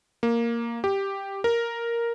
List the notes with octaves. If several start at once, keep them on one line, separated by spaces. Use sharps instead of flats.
A#3
G4
A#4